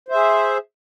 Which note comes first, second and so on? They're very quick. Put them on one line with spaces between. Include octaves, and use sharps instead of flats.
C5 E5 G#4